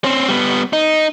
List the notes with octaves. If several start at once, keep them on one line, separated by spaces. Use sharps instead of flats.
C4 C#4
G3 B3
D#4